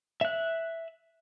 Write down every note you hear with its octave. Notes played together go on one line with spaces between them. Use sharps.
E5 F#6